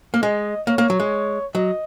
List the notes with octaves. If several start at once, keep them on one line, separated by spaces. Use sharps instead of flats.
A#3
G#3 D#5
A#3 C#5
A#3
F#3
G#3
F#3 D#5